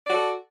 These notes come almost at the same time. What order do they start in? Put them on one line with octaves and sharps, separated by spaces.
D5 F#4 A4